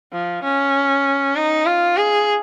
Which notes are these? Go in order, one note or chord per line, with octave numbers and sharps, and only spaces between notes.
F3
C#4
D#4
F4
G#4